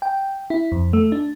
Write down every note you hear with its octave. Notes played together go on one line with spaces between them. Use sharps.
G5
E4
F2
A3
D4